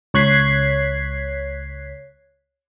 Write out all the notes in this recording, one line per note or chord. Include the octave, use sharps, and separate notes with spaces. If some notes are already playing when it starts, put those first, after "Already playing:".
C#2 C#5 F#6 G#6 B6 C7